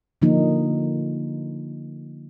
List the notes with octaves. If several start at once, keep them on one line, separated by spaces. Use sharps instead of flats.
D3 F3 A#3 D#4